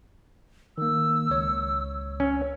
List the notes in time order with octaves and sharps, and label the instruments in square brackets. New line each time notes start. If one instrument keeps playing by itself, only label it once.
[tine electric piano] D#3 A#3 [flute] E6
[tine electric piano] C#2 C#5
[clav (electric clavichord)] C#4